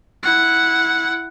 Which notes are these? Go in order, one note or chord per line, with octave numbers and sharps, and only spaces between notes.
E4 F#5